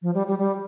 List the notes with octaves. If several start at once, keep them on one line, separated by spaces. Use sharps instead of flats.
F3
G3
G3
G3